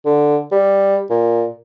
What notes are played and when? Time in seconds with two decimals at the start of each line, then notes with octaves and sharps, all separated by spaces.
0.05 D3
0.52 G3
1.10 A#2